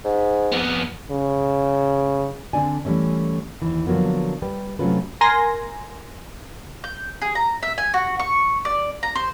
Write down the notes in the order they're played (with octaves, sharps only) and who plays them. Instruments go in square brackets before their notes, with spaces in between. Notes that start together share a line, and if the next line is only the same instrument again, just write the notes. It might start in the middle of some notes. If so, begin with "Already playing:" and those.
[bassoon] G#2
[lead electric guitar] F2 B3
[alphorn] C#3
[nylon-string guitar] D3 C4 D4 D5 G#5
E3 F3 G3 A3 C#4
D#2 E3
D3 F3 F#3 A#3 B3
G3 G4 B4
C3 F#3 A3 C#4 F4 B4
[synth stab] A#4 G#5 C6 A#6
[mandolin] G6
G#4
A#5
E5
G#5
F#4
C#6
D5
A#5
C5